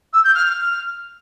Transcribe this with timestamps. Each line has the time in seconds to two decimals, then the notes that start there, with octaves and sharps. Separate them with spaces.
0.13 E6
0.24 G6
0.34 F6
0.45 F6